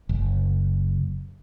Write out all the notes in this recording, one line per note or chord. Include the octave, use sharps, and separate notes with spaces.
F#1